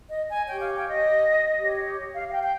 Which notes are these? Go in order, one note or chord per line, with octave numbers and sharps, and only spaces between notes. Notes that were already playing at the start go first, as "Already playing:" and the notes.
D#5
G#5
G4 C#5 G5
F5
G5
D#5
G4 C#5
F5
F5
G5
G5